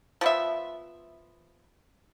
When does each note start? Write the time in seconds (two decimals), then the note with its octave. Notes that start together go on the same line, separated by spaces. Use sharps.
0.21 F3 B3 E5